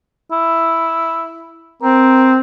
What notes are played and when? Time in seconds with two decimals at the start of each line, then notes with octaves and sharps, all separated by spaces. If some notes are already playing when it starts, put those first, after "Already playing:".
0.32 E4
1.82 C4 A#4